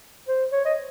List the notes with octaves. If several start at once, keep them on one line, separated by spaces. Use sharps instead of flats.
C5
C#5
D#5